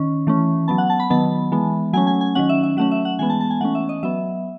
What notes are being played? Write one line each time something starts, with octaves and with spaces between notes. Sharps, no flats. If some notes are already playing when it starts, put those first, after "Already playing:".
Already playing: D#3 C#4
E3 A3 C#4
F#3 B3 A5
F#5
A5
B5
D#3 F#3 B3 A5
E3 G#3 B3
F#3 A3 C#4 G#5
G#5
G#5
D#3 F#3 C#4 F#5
E5
E5
F#3 A3 C#4 F#5
E5
F#5
E3 G#3 B3 G#5
A5
A5
G#5
E3 A3 C#4 F#5
E5
D#5
F#3 B3 E5